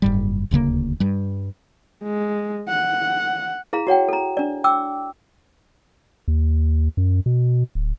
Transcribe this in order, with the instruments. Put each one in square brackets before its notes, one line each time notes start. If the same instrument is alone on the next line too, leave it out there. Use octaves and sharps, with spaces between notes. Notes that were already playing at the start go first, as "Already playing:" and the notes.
[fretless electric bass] F#1 G#2 G3
D#1 D2 C#3 A#3
G2 G3
[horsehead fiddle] G#3
F#5
[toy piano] E4 G#4 F5 A#5
F#4 C#5 F#5 G5
A4 A#5
D4 D5
G5 D6 E6
[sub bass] D#2
F#2
B2
D1